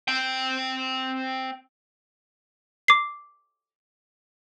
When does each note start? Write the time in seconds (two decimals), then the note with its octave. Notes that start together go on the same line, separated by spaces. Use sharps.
0.08 C4 G5
2.88 D6 C7